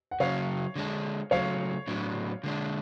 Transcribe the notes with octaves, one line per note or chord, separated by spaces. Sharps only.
F#5
C#3 F#3 C#4 C#5 F5
D3 G#3 D4
C#3 F#3 A3 C#5 F5
A2 F#3 B3 D4
D3 G#3 D4